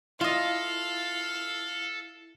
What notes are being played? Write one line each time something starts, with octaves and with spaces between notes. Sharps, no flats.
E4 F4 A4 D#5 F5